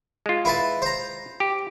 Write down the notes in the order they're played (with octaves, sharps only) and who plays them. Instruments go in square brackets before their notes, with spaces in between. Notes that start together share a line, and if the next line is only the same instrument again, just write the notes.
[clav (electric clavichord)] G#3 F4
[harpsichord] E4 B4 A5
C5 A#5
[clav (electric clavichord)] G4